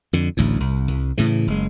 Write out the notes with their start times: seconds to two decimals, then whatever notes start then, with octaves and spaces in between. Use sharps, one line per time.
0.13 F2 D3
0.37 A1 D2 A2
0.60 C2
0.88 C2
1.18 A2 C#3 E3
1.47 F#1 G#3